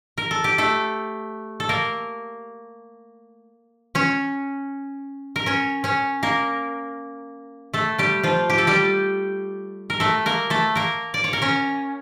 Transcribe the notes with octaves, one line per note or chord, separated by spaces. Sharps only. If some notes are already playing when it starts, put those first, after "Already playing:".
A#4
A4
G4
A3 A4
A4
A#3 A#4
C#4 C#5
A#4
C#4 C#5
C#4 C#5
A#3 A#4
A3 A4
G3 G4
F3 F4
G4
A4
G3 G4
A#4
A3 A4
A#3 A#4
A3 A4
A#3 A#4
D5
C#5
A#4
C#4 C#5